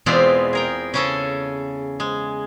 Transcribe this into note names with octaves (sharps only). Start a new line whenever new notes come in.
E2 B2 G#3 C4 F4 D5
G#4 A#4 G5
C#3 C#4 A4
G#3